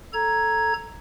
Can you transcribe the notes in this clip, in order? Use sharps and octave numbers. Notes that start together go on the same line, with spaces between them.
A4 A#5 G#6